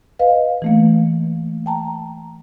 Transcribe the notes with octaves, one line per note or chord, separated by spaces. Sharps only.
B4 D#5 F5
E3 A3 A#3
G5 A5 A#5